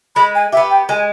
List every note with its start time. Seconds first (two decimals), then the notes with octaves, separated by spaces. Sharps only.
0.16 G#3 B5
0.35 G#5
0.52 B3 G4 E5
0.70 G5
0.89 G#3 G#5